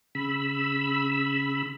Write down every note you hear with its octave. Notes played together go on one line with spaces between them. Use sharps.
C#3 B5 E6